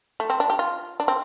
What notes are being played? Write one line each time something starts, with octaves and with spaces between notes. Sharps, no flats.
A3
C4
D4
G4
F4
D4
C4